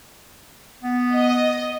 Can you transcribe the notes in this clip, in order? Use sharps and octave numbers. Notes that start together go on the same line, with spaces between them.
B3
D#5